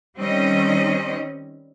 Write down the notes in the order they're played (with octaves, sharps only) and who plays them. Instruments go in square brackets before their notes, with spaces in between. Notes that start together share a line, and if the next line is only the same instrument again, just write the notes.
[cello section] D#3 G3 C4 C#4 D#5